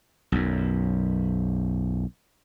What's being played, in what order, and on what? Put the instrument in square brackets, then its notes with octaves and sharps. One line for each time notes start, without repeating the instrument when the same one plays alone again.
[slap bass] B1 F#2